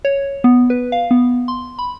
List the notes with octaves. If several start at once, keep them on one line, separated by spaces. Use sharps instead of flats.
C#5
B3
B4
F5
B3
C6
B5